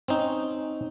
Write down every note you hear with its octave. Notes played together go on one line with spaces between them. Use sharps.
C4 C#4 D#4